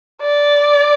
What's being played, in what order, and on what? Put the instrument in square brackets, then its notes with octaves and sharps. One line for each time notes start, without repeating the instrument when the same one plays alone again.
[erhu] D5